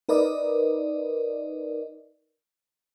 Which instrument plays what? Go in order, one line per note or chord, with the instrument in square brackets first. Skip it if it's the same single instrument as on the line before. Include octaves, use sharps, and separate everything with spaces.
[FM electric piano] D#4 A#4 B4 D5 D#5